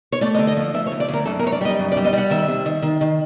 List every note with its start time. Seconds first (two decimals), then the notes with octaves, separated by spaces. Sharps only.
0.12 C#5
0.21 A3 D5
0.34 D#5
0.39 D3
0.47 D#5
0.57 F3
0.74 F3 E5
0.87 C#5
0.92 D2
1.00 D5
1.08 D2 A#4
1.26 F#2 A4
1.39 A#4
1.43 F#2 C#5
1.52 D5
1.61 G3 D#5
1.79 F#2
1.92 D5
1.96 G3
2.05 D#5
2.13 G3 F#5
2.30 D#3 E5
2.48 C3
2.66 D#3
2.82 D#3
3.01 D#3